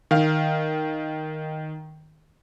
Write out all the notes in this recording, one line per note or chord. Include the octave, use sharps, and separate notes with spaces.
D#3 F5